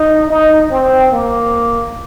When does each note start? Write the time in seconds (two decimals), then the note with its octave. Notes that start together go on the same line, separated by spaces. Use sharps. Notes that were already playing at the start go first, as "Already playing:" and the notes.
Already playing: D#4
0.30 D#4
0.71 C4
1.11 A#3